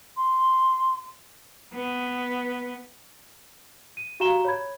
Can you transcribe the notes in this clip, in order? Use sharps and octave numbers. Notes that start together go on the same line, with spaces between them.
C6
B3
D#7
F#4 G4 F5 A#5 E7 G7
C#5 B5 G#6